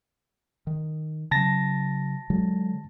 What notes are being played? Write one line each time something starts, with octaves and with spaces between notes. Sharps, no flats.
D#3
C#3 F#3 A5 A6 A#6
D3 F#3 G#3